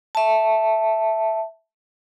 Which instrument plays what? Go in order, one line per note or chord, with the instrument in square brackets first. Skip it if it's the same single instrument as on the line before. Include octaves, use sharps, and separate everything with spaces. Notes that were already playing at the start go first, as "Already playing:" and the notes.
[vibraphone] E5 A5